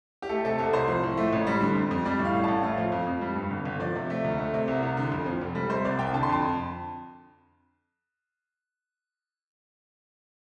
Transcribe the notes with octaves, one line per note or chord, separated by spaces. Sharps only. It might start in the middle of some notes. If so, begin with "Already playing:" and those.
G4
A3 A4
C3 A4
C2 A4
C2 C5
F3
A2
A3
A1
G3
D3
F2
F2
G3 D5
A2
F5
A1
A1 A5
A3 F5
F3
F2
F2
G3
G2
G1
G1
F3 D5
C3
A3
D2
A3
C3
C2
C2
D3
F2
F3
F1
G3
C3 C5
C2 D5
C2 G5
D3 A5
C6
F2 A5